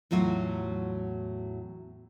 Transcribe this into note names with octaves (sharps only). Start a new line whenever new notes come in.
E2 A2 F#3 F4 F#4